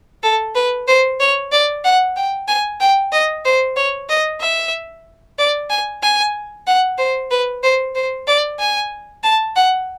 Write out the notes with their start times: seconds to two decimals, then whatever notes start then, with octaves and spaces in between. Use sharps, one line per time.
0.23 A4
0.55 B4
0.87 C5
1.20 C#5
1.52 D5
1.84 F#5
2.16 G5
2.48 G#5
2.81 G5
3.12 D#5
3.45 C5
3.76 C#5
4.09 D#5
4.41 E5
5.38 D5
5.70 G#5
6.03 G#5
6.67 F#5
6.98 C5
7.30 B4
7.63 C5
7.95 C5
8.27 D5
8.59 G#5
9.23 A5
9.56 F#5